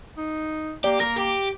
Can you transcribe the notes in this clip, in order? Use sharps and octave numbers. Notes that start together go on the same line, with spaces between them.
D#4
A#3 G4 D5
A#3 A#4 A#6
G4